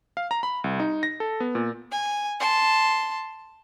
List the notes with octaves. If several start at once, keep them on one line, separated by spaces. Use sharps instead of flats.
F5
A#5
B5
C2
D#4
A#6
A4
B3
A#2
G#5
A5 C6